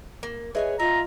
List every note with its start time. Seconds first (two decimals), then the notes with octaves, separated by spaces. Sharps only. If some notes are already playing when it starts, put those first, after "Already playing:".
0.23 A#3
0.55 G#4 B4 C#5 D#5 E5 G#5
0.80 F4 D#5 E5 A#5